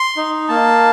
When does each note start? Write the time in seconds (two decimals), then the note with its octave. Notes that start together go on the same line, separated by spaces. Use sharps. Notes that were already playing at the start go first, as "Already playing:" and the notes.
Already playing: C6
0.17 D#4
0.49 A#3 A5